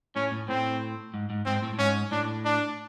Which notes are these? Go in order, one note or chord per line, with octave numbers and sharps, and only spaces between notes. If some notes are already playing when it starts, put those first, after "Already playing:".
A2 C#4
A2
A2 C4
G#2
G#2
G#2 C4
A2
A2
G#2 C#4
A2 D4
D4